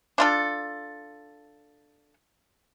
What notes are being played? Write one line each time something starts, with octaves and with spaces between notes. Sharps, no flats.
D4 F4 A4